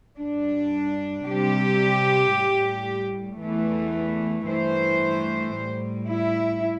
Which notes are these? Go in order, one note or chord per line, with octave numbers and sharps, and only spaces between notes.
G2 G3 D4
C3 G3 G4
A2 G3
E2 E3 A3
G2 E3 A3 C5
A2 G3
E4